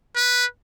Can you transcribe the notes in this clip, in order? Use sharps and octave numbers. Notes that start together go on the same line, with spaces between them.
B4